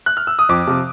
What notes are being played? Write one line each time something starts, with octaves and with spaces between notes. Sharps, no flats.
F#6
F6
E6
D#6
F2 D6
C3 F3